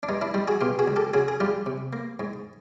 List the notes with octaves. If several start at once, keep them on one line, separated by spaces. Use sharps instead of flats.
D4
G2 D#4
D4 E4
G3 D#4
F#4 G#4
B2 F4 G4
F#4 G#4
C#2
G4 A4
C#3 F#4 G#4
G#4
G3 F4 G4
C3
A#3
G#2